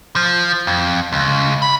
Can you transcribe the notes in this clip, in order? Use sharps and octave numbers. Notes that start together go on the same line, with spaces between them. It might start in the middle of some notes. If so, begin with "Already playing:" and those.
F3
F2
C#2
B5